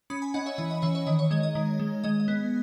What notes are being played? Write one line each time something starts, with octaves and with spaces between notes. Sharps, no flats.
C#4 B5 D#6
G#5 B5
C#4 D#5 F#5
C#5 E5
E3 D#5
D#5
E3 C#5 E5
C#5 E5
D#3 D#5
C#5
G#3 D#5
D#5
D#3
G#3
G#3 D#5
D#5
B3